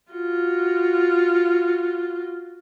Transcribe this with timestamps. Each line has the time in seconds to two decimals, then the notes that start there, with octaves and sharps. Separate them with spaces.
0.12 F4 F#4